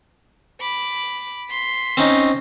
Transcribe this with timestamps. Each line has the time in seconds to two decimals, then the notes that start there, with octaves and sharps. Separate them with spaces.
0.60 B5 D6
1.50 C6 B6
1.97 C4 C#4 D#4